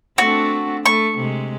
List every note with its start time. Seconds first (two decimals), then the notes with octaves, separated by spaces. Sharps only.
0.18 A3 C4 D4 F#4
0.86 A3 C#6
1.17 C3 G#3